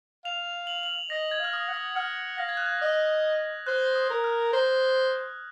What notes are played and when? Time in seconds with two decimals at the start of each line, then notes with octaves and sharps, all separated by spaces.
0.25 F5 F7
0.67 F#7
0.83 F#7
1.10 D#5 A#6
1.31 G#6
1.39 F5 F6
1.53 D#6
1.68 F#5
1.74 D#6
1.96 F#5 F6
2.38 F5 A#6
2.49 G#6
2.57 F#6
2.66 G#6
2.82 D#5
3.67 C5 F#6
3.95 D#6
4.10 A#4
4.24 F6
4.53 C5